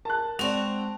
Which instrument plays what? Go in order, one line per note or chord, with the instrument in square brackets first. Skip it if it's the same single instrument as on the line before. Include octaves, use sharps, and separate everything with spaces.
[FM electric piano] A#4 [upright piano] A5 F#6
[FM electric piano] G#3 D5 [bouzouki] C4 F#4 [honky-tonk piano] F7